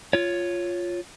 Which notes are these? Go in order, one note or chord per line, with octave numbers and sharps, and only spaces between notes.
F4 C#5